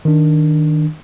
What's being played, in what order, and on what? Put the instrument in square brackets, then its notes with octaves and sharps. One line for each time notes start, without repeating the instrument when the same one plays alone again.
[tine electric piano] D#3 D4